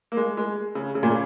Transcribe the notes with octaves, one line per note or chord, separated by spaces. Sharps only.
A#3
G#3
G#3
C#3
C#3
A#2
C#3